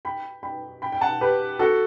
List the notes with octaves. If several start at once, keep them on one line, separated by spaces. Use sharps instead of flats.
G5 B5
G5 B5
G5 B5
G5
F#5 A5
G4 B4
F#4 A4